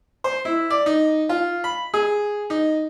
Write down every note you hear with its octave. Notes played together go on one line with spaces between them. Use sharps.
C5
E4
D5
D#4
F4
B5
G#4
D#4